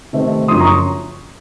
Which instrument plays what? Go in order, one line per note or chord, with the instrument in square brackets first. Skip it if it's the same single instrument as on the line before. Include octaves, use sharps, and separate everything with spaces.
[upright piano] C3 D#3 A3 C4
F#2 C#3 F3 C6 D#6
A#5 C#6